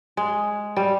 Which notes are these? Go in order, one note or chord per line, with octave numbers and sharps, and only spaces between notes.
G#3
G3